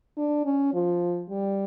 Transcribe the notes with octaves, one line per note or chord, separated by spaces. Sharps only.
D4
C#4
F3
G3